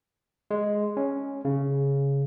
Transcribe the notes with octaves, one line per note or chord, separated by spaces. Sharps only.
G#3
C#4
C#3